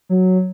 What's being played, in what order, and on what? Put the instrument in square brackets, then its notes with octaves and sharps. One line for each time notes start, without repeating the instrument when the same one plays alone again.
[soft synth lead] F#3